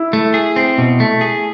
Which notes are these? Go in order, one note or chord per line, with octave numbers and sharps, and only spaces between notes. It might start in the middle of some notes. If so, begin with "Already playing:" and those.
Already playing: E4
A3
G#4
C4
B2
A3
G#4